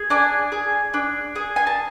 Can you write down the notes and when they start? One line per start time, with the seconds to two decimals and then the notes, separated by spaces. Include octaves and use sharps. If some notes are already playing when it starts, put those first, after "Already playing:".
Already playing: G#4
0.10 D4 G#5
0.52 G#4
0.94 D4
1.36 G#4
1.56 G#5
1.67 A5